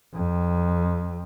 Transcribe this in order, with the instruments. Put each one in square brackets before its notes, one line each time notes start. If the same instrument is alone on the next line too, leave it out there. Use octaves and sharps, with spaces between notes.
[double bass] F2